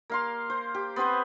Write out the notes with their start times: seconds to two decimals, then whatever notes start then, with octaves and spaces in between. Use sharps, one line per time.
0.10 A#3 F5 C6
0.50 C5
0.75 G4
0.96 B3 C4 B4 C5